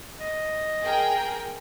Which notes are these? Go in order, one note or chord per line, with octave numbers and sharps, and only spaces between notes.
D#5
G#4 A#4 G5